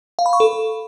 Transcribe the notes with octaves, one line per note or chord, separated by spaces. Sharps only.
F5
B5
C#6
A4